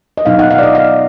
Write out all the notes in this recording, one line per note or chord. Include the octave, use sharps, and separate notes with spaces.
D#5
B2 F#3 B3 D#4 F5
F#5
F5
D5
D#5
F5